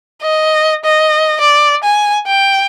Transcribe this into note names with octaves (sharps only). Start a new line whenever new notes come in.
D#5
D#5
D5
G#5
G5